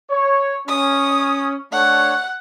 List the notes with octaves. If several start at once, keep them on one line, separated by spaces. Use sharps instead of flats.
C#5
C#4 D#6
A3 D4 C#5 F#5